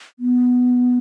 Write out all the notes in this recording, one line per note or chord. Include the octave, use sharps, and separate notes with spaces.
B3